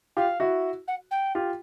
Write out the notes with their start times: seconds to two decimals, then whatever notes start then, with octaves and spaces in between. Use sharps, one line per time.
0.17 F4 G4 F5
0.40 E4 F#4
0.88 F#5
1.11 G5
1.35 F4 G4